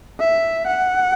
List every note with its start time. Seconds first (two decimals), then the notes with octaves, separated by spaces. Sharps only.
0.20 E5
0.67 F#5